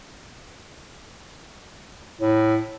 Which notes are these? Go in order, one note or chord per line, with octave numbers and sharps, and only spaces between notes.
A2